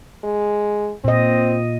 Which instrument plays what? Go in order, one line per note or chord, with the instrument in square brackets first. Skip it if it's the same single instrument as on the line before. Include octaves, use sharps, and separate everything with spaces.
[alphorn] G#3
[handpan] A#2 D#5 [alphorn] C4